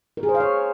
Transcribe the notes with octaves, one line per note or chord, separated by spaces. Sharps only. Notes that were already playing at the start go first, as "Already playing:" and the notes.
A#4
G#4
C5
F5
C#5